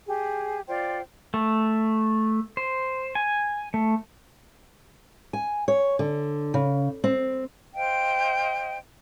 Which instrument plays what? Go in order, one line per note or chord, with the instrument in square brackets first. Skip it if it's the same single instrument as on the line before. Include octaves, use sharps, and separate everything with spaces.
[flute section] G4 G#4
F4 C5 D5 G5
[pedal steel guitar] A3
C5
G#5
A3
[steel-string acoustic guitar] G#5
C#5
D3
C#3
C4
[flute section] C5 D#5 F5 G5